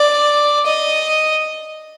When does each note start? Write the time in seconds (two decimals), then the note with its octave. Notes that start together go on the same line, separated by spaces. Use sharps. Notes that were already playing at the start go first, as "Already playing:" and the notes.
Already playing: D5
0.66 D#5